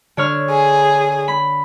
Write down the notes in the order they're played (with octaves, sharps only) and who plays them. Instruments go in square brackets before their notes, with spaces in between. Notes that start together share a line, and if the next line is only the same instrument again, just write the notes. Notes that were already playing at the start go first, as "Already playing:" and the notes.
[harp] D3 C#5 F6
[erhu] G#4
[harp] B5